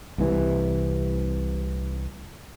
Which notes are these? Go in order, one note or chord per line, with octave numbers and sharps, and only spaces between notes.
C2 C3 E3